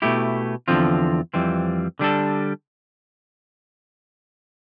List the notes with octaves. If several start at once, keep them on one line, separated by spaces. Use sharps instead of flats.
B2 A3 E4 G4
E2 D3 F3 C4 F4
F2 E3 G3 C4
D3 G3 D4 A4